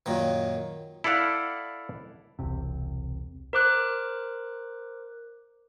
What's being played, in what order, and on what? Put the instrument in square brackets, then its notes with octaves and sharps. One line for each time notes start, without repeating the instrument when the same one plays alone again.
[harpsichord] F#2 A#2 D#3
[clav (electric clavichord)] E4 A4 D5 F5 F#5
[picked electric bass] E1 C2 C3
[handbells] A#4 C5 D6 F#6